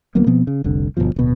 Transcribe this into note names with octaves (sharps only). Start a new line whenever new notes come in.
D2 F#3 A#3 B3
B2 F3 B3 C4
C#3
F1 C2 D3
G1 C2 B2 F3
D1 B2